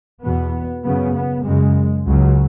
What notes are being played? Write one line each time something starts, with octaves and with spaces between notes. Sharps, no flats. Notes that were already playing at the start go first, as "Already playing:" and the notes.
E2 B2 B3
F#2 C#3 B3
B3
F#2 C#3 G#3
C#2 C#3 F#3